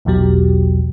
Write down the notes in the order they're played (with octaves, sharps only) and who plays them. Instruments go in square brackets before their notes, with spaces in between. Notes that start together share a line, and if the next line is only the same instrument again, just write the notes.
[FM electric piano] A#1 E2 B2 F#3 G4